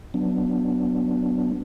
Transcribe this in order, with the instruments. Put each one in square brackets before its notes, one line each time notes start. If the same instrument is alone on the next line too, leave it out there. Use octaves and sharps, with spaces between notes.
[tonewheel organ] F#3 B3 D4